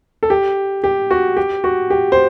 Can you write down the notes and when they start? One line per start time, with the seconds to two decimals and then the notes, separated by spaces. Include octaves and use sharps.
0.23 A4
0.30 G4
0.84 G4
1.11 F#4
1.37 G4
1.64 F#4
1.90 G4
2.12 C5